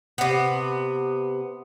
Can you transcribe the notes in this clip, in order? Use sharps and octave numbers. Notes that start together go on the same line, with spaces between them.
C3 B3